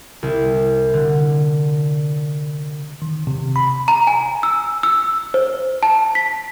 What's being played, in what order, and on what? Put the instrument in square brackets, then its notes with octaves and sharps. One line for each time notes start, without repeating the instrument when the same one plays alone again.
[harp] C2
D3
[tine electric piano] D#3
C3
B5
[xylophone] A#5
G#5
E6
E6
C5
A5
B6